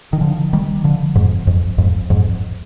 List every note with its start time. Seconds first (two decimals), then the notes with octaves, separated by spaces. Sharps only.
0.13 D#3
0.21 D3 F3
0.53 D#3 G3
0.84 D3 F3
1.15 F2 G#2
1.47 F2 G#2
1.78 F2 G#2
2.10 F2 G#2